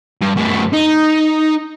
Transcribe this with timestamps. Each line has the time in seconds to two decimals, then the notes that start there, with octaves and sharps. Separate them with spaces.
0.21 G2
0.36 F#2 A3
0.73 D#4